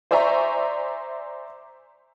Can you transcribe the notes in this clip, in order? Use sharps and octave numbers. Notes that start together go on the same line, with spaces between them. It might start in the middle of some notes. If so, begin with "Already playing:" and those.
C5 D5 E5 G#5 A#5 C#6